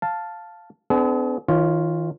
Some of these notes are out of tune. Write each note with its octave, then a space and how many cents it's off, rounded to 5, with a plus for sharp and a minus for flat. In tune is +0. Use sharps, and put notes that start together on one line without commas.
F5 +0 A5 +0
B3 +45 D4 +0 G#4 +45
D#3 +45 F4 +0 C#5 +0